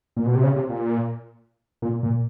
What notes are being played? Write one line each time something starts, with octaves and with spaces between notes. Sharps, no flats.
A#2
B2
C3
C#3
C3
A#2
A#2
A#2